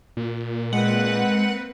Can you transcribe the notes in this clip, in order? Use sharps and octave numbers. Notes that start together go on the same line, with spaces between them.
A#2
G#3 A#3 C4 B4 F#5